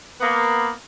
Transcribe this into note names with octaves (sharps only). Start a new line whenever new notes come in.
A#3 B3